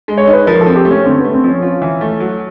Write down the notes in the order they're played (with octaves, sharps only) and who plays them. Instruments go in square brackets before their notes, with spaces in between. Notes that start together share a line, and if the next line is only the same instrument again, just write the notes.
[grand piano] G#3
[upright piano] C#5
[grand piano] D#4
[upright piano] B4
[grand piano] F3 [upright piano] A#4
[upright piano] A4
[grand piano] C4
[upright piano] G4
[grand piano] A3
[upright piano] C#4
[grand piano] D3 [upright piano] C4
[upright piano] B3
[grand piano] A3
[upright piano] C4
[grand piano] F3
[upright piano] C#4
[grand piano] F4
E3
A3
F#3